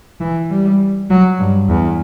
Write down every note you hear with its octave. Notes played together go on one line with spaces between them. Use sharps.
E3
G3
F#3
G2
E2